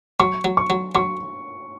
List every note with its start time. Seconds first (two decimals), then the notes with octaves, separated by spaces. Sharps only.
0.20 F#3 C#6
0.44 F#3
0.57 C#6
0.70 F#3
0.95 F#3 C#6